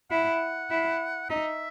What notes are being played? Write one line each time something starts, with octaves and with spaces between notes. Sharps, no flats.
E4 F#5
E4
D#4 E5